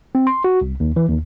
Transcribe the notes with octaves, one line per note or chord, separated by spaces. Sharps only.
C4
C6
F#4
C2
D#2
E3
D#2